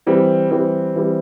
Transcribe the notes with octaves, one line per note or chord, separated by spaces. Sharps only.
E3 G3 C4
E3 G3 C4
E3 G3 C4